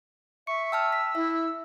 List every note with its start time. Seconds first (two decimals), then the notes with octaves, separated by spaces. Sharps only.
0.47 E5 C#6 C#7
0.72 G5 A5 E6 F6
0.92 B6
1.15 E4 E5